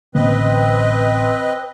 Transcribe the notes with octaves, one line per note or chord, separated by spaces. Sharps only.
A1 D3 A#3 C4 B4 D#5